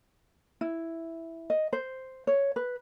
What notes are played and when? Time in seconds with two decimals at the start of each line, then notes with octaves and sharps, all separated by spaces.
0.61 E4
1.50 D#5
1.73 C5
2.27 C#5
2.56 B4